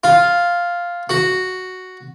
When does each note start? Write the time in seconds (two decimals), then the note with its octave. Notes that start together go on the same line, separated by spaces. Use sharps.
0.04 F4
1.09 F#4